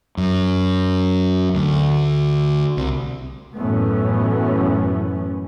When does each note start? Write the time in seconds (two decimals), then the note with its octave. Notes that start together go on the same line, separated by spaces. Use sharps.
0.17 F#2
1.54 D2
2.77 C2
3.56 F#2 A2 E3 A3 B3 C#4